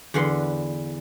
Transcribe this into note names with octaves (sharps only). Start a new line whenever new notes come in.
E2 D3 B4 F#5 C6